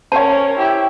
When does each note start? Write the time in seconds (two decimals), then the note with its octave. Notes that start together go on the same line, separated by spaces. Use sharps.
0.12 C#4 A#4 C5 C#5 A5
0.58 E4 G4